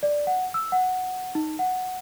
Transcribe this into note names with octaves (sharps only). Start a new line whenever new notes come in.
D5
F#5
E6
F#5
D#4
F#5